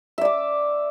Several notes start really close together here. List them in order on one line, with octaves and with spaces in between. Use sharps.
E5 D5 D6